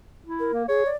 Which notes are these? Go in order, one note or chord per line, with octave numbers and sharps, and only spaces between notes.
E4
A#4
A#3
G#4 C#5
D5